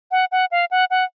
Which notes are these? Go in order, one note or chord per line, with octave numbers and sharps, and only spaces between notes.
F#5
F#5
F5
F#5
F#5